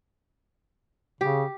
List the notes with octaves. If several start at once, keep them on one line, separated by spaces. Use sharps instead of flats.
C#3 G4